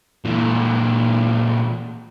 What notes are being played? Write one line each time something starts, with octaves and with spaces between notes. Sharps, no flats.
A#2 E3